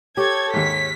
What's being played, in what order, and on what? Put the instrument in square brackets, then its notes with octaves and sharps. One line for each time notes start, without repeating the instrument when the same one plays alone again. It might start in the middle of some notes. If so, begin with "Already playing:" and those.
[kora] G4 [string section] A4 G#6 [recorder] C#5
[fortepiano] D#2 G#2 [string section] B6